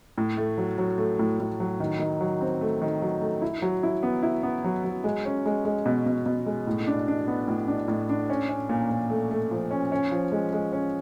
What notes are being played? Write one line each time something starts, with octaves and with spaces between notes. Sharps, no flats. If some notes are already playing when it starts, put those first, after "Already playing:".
A2
A3
F#3
F#3
A3
A2
A2
F#3
D#3
D#3
F#3
C4
A3
D#3
F#3
A3
E4
F#3
E4
B3
E4
B3
F#3
F#3
G#3
C#4
G#3
G#3
B2
B2
B2
G#3
A2
D4
D4
B3
A2
D4
A2
D4
C#4
C#4
A#2
A#2
A3
A3
F3
C#4
C#4
F3
G#3
G#3
C#4